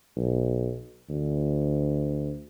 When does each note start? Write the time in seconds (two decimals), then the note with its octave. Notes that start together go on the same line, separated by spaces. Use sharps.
0.16 B1
1.09 D2